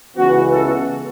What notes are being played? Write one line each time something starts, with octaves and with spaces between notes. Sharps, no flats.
C#2 C#3 E3 B3 F#4
F#4 A4